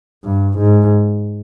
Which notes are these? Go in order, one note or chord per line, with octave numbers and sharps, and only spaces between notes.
G2
G#2